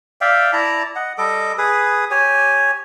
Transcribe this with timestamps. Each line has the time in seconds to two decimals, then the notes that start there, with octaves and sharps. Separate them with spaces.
0.21 D5 E5 F5 G5
0.53 E4 D5 A5 A#5
0.95 D#5 F#5
1.18 G3 A4 D#5 D6
1.58 G#4 B4 D#6
2.11 G4 C#5 G#5